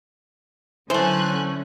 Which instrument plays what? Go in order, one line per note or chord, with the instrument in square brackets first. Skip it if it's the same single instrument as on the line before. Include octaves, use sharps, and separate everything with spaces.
[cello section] D3 C#4 [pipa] E3 A3 [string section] F#3 G#5 F#6 [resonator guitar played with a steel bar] C5